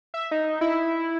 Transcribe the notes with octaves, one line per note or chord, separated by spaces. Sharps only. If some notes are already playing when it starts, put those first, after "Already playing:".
E5
D#4
E4